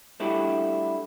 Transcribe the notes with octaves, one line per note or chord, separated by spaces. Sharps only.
G3 A3 D4 E4 F#4 G4